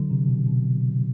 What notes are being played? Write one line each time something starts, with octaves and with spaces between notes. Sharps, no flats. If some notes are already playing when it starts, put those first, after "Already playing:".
Already playing: D3 F#3
C3
B2
B2